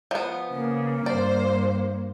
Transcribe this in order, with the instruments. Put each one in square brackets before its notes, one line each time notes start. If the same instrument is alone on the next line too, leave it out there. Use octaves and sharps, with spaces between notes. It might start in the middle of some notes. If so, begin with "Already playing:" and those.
[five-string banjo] F3 B3
[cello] C#3 [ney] A#3
[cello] G2 [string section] C5 [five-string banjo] D5